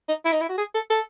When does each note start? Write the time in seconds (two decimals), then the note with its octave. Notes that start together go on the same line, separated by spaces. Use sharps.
0.08 D#4
0.25 E4
0.32 D#4
0.40 E4
0.49 F#4
0.58 G#4
0.74 A4
0.90 A4